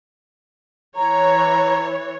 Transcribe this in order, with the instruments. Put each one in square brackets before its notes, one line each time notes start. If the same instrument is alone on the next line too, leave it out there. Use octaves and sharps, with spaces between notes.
[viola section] E3 C#5 [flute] A#5